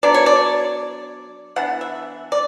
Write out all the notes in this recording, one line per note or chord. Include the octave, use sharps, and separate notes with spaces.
F#3 B3 D4 D5
C#5
D5
E3 B3 D4 F#5
E5
D5